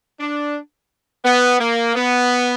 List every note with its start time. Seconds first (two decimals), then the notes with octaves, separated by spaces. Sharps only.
0.20 D4
1.25 B3
1.60 A#3
1.95 B3